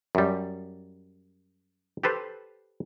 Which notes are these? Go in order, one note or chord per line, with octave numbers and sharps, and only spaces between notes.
F#2 G3
G4 A4 B4 C5